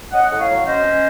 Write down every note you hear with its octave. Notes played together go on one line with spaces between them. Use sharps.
C#4 D#5 F#5
A2
C#5 F5
F#3
C#4 C5 D#5
C#4